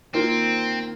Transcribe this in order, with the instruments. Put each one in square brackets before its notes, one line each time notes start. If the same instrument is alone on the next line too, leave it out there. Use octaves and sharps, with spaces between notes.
[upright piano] D#3 A#3 F4 [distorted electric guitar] C4